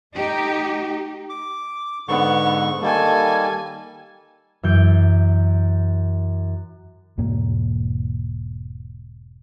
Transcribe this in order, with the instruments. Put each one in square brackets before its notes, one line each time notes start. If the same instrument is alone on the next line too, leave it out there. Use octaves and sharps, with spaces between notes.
[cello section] A3 D#4 G4
[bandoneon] D6
[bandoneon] G#2 D3 C#6 [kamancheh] B3
[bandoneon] D#3 G3 A#3 [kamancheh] A4 G#5
[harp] F#2 E3 G6 D7
[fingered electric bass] E1 G#2 A#3